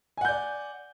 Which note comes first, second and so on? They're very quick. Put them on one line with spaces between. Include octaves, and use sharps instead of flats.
G#5 F#5 G6 D5